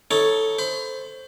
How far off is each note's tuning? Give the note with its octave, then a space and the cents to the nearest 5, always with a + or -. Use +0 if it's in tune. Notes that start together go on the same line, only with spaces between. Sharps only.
D#4 +25 A4 +0 C#5 +0
C5 +0 B5 +35